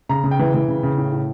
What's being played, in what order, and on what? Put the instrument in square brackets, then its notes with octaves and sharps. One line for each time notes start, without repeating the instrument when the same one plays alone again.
[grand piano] C#3 A#5
C#3
G5
E3
E3
C#3
C#3
A2
A2